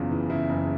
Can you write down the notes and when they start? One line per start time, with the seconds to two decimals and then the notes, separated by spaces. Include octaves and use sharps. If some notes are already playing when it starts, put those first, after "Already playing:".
Already playing: F#1 E2 C#3 F4
0.11 E3
0.30 C#3 E4
0.49 F#1